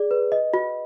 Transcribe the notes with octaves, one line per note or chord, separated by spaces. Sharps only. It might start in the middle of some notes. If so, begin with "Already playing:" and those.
Already playing: G#4 D5
B4
D#5
F#4